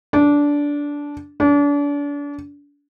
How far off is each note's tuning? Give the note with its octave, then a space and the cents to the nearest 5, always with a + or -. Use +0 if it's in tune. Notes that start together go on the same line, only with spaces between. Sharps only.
D4 -15
D4 -35